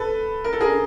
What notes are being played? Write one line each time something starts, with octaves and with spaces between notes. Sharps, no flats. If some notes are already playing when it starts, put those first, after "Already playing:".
Already playing: A4 B4
A#4
A4
G#4 A#4